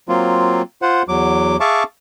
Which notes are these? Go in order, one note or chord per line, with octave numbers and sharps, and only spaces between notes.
F#3 A#3 C4 F4
F4 C5 F#5
E2 F#3 D6
G#4 E5 F5 A5 C#6 D6